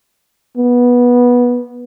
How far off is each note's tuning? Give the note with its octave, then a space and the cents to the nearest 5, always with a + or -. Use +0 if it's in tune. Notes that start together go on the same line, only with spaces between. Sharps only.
B3 -15